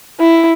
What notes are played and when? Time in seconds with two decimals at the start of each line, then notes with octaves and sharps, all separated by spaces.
0.20 E4